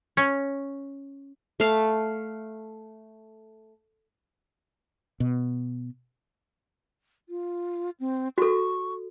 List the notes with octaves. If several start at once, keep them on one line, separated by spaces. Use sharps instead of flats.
C#4
A3 F5
B2
F4
C4
F#4 A4 C#6